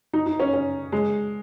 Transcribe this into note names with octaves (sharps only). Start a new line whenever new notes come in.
D#4
D#4
C#4
C#4
G#3